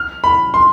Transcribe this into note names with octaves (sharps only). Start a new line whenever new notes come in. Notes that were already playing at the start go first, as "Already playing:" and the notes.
Already playing: F6
B5
C6